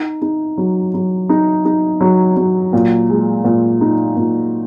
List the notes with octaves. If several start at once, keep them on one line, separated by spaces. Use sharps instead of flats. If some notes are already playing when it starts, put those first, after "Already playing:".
Already playing: D#4
D#4
F#3
F#3
D#4
D#4
F#3
F#3
A#2
G#3
A#2
D#4
A#2